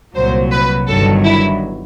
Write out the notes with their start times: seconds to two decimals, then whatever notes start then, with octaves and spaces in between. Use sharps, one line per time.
0.15 C2 A#2 F#3 C5
0.52 B4
0.88 G1 G2 D#3 F#3 A4
1.25 E4